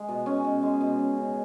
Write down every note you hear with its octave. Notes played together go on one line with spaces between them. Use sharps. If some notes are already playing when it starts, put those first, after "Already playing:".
Already playing: G#3
B2
C#4
B2
G#3
B2
C#4
C#3